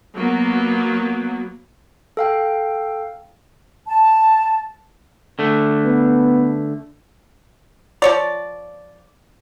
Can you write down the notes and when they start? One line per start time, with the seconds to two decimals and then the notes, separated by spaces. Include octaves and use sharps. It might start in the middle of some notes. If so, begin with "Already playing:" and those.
0.16 F#3 A#3 B3
2.17 A4 F5 G5
3.88 A5
5.39 D3 A3
5.85 B3
8.02 F3 C#5 D5